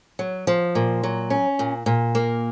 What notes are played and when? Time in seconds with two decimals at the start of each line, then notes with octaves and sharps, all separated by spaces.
0.19 F#3
0.47 F3
0.75 A#2
1.03 F#3
1.30 C#4
1.59 A#2
1.86 A#2
2.15 A#3